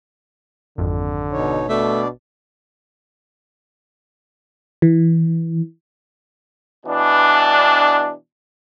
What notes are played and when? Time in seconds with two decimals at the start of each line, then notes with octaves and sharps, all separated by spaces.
0.78 G#1 F2 D3
1.32 B2 D#4 C#5
1.69 B2 A3 D4 D5
4.82 E3
6.86 B2 E3 D4